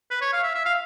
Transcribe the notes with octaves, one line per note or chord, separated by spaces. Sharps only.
B4
C#5
F5
E5
E5
F5